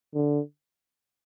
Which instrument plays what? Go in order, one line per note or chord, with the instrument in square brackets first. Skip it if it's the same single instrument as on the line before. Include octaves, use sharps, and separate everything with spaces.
[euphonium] D3